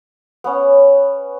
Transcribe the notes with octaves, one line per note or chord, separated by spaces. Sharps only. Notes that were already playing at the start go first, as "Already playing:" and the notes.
B3 C#4